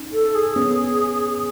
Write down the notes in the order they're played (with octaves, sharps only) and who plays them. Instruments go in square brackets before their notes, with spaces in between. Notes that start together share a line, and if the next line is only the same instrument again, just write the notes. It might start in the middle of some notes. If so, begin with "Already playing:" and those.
Already playing: [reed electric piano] C#4 D#4
[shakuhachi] A4
G#4
[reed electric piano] B3 C#4